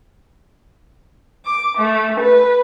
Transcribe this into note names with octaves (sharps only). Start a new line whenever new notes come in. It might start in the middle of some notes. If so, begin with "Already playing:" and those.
D6
A3
B4